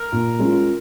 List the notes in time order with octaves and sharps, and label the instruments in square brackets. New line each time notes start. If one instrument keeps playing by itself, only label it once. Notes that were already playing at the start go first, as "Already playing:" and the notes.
Already playing: [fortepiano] A#4
[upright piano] A#2
G#3 C#4 F4